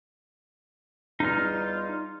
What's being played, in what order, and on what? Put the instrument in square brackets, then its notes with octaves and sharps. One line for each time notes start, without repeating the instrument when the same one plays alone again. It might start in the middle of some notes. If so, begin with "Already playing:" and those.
[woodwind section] E2 G3 F4 [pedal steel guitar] D#4 F6